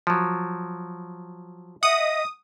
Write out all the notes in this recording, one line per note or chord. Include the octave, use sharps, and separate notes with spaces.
F3 F#3
D#5 E5 F#5 D#6